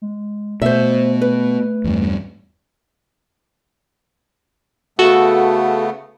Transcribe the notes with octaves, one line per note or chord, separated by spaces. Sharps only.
G#3
B2 A3 C5 E5
B4
E2 G2
C#3 A3 B3 F#4 A4